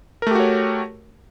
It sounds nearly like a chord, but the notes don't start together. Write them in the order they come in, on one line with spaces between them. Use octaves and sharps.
A#4 A3 G4 F#4 C#5